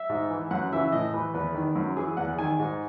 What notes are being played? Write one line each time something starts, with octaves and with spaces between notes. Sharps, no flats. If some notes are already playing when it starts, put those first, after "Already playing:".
Already playing: E5
G#2
E3
F#2 F#5
C#3 E3 E5
A2 D#5
E3 B4
E2 B4
D#3
F#2
E3 G#4
E2 F#5
D#3 G#5
G#2